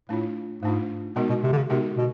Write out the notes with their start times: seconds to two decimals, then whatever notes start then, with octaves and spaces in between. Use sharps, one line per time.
0.09 A2 A3 D4 F4
0.62 G#2 A3 D4 F4
1.16 B2 G#3 B3 D#4 F#4 A#4
1.29 B2
1.43 C3
1.52 D3
1.57 C#3
1.70 C3 G#3 B3 D#4 F#4 A#4
1.97 B2